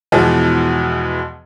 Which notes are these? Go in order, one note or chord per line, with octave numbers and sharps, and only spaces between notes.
E2 B2 E3 F3 G#3